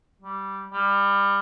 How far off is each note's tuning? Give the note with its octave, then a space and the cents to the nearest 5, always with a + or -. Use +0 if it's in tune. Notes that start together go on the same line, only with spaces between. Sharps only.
G3 -10
G3 +25